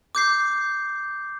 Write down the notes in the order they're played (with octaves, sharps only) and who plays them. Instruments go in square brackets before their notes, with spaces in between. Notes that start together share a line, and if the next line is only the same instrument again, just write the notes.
[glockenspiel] D6 G6 C7